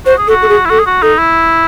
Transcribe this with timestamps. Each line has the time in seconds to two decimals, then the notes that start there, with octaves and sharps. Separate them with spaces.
0.06 F#4 C5
0.18 G#4
0.28 F#4 A4
0.42 A4
0.49 G#4
0.65 E4
0.70 F#4 A4
0.79 G#4
0.86 F#4
1.02 D#4 A4
1.18 E4